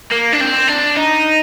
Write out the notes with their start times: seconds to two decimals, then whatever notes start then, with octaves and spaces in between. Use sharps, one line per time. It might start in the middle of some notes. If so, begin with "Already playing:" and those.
0.11 A#3
0.33 D4
0.40 C4
0.68 D4
0.97 D#4